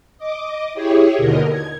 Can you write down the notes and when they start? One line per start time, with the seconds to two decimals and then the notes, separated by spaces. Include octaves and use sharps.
0.18 D#5 D6
0.74 E4 G4 G#4 C#5
1.17 D#2 B2 D3 A#4 D#5
1.48 G#6